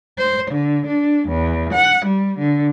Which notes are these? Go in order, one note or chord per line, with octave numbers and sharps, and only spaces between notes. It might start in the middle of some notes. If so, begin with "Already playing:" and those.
C5
D3
D4
E2
F#5
G3
D3